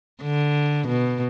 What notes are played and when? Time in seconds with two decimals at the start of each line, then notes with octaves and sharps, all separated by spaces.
0.22 D3
0.87 B2